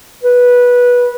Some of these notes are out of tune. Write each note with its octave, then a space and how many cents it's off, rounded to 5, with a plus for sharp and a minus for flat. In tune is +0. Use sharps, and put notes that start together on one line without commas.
B4 -15